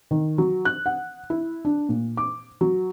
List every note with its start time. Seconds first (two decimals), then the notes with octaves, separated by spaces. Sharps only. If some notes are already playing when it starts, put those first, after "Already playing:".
0.11 D#3
0.38 F#3
0.65 F#6
0.86 F#5
1.30 E4
1.65 D4
1.89 A#2
2.17 D6
2.61 F#3